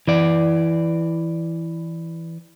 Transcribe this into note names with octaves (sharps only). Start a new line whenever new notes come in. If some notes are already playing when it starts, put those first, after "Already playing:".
E3 D5